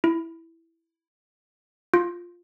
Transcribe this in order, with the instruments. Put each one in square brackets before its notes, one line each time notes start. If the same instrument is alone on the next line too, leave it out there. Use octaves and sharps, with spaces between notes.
[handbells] E4
F4